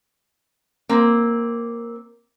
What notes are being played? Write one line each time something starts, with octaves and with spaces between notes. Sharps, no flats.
A#3 C4